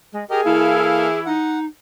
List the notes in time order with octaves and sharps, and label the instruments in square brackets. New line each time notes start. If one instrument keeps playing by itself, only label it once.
[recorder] G#3
[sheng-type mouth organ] G4 A#4 D#5 [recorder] G#4
[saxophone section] E3 E4 [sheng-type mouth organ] A#3 A4 F5
[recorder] D#4 [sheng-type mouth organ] F#5